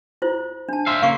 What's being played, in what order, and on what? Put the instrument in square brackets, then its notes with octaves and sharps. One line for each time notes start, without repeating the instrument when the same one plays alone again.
[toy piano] E4 F4 C5
D4 A5
[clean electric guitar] C5 E5 F5
[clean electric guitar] C#3 A#3 [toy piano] F5 C#6 D6